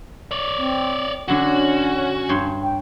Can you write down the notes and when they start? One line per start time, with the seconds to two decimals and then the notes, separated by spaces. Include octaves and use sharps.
0.31 C#5 D5
0.57 C4
1.28 D3 F#3 C#4 F#4
2.29 G2 C#5 C6
2.62 G5